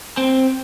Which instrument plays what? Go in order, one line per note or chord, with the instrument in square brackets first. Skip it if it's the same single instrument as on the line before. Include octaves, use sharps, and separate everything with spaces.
[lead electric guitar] C4